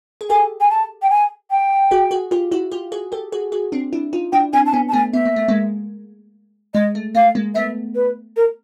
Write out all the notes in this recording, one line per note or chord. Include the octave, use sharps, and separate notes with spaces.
G#4
G4 A4 G#5
G#5
A5
G5
G#5
G5
F#4 G#4
F#4 G#4
F4 G4
E4 F#4
F4 G4
F#4 G#4
G4 A4
F#4 G#4
F#4 G#4
C4 D4
D4 E4
D#4 F4
D4 E4 G5
C4 D4 G#5
A5
B3 C#4 G#5
A5
A3 B3 G#5
B3 E5
A#3
A3
G#3 A#3
G#3 D#5
A3
A3 F5
G#3 A#3
A3 B3 E5
B4
A#4